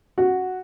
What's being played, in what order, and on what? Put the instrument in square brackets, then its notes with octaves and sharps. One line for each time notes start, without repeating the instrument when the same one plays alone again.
[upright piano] F#4